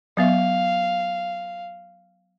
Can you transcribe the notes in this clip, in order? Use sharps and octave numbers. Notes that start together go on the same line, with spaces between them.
F#3 B3 E5 F5